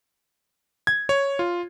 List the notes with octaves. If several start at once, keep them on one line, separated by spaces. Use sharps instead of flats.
G#6
C#5
F4